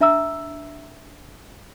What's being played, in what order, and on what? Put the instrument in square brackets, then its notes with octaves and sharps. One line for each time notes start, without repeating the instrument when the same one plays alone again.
[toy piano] D4 E5 A#5 E6